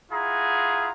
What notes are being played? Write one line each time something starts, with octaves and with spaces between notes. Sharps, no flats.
E4 F4 G#4 F#5 A#5